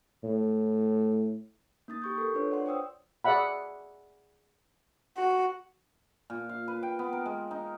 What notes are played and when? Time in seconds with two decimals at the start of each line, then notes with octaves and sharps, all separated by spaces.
0.24 A2
1.88 A#3 D#4 D#6 A6
2.02 G4 C#6 G6
2.18 A4 A#4
2.34 D4 F4 B4 C#5
2.51 D5 F#5 C6
2.66 C5 G5 D#6 E6
3.24 G#4 D5 E5 F#5 B5
5.18 F#4
6.30 A#2
6.49 F5
6.68 B4
6.83 G5
6.99 B3
7.13 A#4
7.26 G#3
7.51 D#4